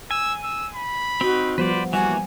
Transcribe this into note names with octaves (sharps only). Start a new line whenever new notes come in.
G#5 E6
E6
B5
C4 D#4 F#4
F3 G3 B3 B4 C5 D5
E3 G3 A#3 F#4 G#5